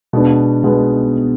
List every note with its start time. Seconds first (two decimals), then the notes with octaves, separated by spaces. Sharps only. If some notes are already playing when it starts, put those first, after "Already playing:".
0.13 B2 G#3 B3 D4
0.64 B2 G#3 B3